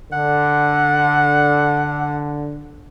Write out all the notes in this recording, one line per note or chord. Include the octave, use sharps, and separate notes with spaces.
D3 F#5